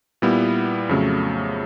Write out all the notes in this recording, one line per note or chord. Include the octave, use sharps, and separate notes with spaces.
A#2 G3 B3 E4
F2 C#3 F#3 A3